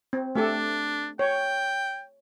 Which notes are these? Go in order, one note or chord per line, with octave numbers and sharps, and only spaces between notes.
C4
A3 D4 G4 A4
C#5 G5